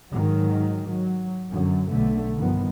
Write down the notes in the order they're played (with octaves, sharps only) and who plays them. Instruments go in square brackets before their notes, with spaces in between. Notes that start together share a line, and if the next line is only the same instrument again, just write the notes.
[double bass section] G#2 D#3 F#3
F#3
F#2 D3 F#3
B1 D3 A3
G2 D#3 F3 B3